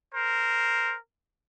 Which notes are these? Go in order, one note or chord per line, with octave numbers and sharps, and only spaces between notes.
A#4 C5